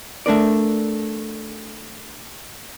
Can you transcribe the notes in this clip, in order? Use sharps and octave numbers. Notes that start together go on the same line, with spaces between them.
A3 D4 A#4 D5